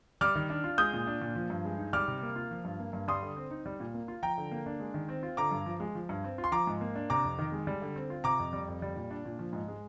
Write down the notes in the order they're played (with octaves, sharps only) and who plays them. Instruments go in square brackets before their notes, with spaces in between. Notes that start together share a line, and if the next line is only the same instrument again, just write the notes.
[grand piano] G3 D6 F6
D#3
D4
F4
G#3 D#6 G6
A#2
D4
A#2
F3
G2
G#3
D#4
G3 D6 F6
C3
A#3
F4
F3
G2
A#3
G2
G3 C6 D#6
D3
C4
D#4
G3
A#2
A#3
F4
F3 G5 A#5
D3
A#3
D4
G#3
D#3
C4
F4
D3 A#5 D6
G2
F3
G#3
F3
G2
C4
F4
C6
F3 A#5 D6
G#2
A#3
D4
C3 A#5 D6
F2
D#3
G#3
G3
D3
C4
F4
C3 A#5 D6
F2
G3
F2
G3
A#2
D4
A#2
F3
G#2
G#3